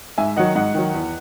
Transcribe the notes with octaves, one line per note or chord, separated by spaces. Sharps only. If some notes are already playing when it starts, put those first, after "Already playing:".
G#2 E5 G#5
D#3 F#3 D#5 F#5
G#2 D#5 F#5
D#3 F#3
E2